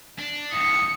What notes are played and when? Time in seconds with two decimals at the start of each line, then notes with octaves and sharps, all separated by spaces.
0.19 D4
0.52 D#2 A2 D#6 C#7